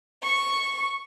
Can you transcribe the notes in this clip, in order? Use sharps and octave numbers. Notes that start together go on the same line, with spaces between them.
C#6